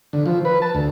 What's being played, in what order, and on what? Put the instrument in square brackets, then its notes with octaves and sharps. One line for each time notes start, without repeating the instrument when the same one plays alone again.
[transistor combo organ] D3
F3
B4
A5
D2